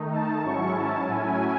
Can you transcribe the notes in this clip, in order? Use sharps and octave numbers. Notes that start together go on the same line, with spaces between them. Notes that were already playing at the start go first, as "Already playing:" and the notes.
Already playing: D#3 A3 D#4
A5
G#2 F#3 C#4 E4 C#6
A5
A2 F#3 C#4 E4 G#5